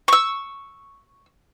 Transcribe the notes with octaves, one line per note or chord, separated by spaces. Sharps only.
C#6 E6